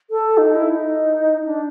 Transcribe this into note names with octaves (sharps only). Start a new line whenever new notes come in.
A4
D#4
E4
D#4
D4